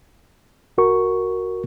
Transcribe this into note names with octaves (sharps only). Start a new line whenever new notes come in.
C2 F#4 A#4 C#6